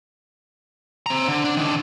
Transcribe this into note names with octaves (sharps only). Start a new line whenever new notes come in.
C4 A#5
D3
D4
D#3 D4